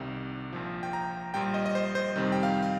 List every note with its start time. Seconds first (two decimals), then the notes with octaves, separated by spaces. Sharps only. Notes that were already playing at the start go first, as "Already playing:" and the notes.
Already playing: C2 C3 D#3 G3
0.53 A#1 A#2 F3
0.83 G5
0.93 A#5
1.34 A#1 A#2 G3 G5
1.54 D#5
1.66 D#5
1.75 C5
1.95 C5
2.16 F2 C3 D#3 G3
2.32 G5
2.43 F5
2.63 F5